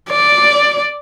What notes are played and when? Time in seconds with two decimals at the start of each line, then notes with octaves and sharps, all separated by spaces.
0.10 D5